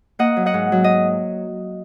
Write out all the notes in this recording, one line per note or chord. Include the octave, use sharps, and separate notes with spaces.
A#3 D#5 F#5
F#3
D#5 F#5
G#2
F#3
D#5